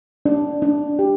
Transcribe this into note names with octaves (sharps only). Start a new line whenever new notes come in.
D4
D4
G4